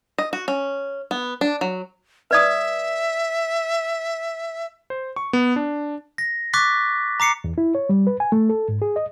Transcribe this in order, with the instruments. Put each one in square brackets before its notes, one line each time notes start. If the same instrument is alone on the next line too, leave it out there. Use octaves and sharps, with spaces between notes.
[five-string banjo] D#5
F#4
C#4
B3
D4
F#3
[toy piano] B4 D5 D#6 [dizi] E5
[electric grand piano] C5
C#6
B3
D4
[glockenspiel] A#6
C#6 D6 F#6 A6 B6
A#5 D6 C7 C#7
[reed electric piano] E2
E4
C#5
G3
B4
G#5
A3
A4
G#2
G#4
D#5